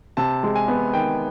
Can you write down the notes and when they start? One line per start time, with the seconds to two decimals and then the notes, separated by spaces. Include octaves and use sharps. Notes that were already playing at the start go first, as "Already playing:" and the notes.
0.17 C3 A5
0.43 G#3
0.55 G#5
0.68 B3
0.93 D#3 G5